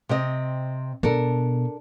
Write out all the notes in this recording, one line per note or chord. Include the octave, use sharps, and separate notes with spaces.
C3 C4 D#5
B2 D4 A4 A#4